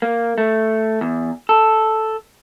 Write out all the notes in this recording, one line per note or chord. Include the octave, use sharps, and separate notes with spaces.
A#3
A3
E2
A4